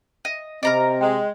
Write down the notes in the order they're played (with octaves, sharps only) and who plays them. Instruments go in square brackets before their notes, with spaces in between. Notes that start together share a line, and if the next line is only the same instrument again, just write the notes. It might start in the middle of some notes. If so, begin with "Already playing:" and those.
[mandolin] D#5
[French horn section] C3 C4 [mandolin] A#4 A#5 D6 [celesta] D#5
[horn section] G#3 [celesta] G5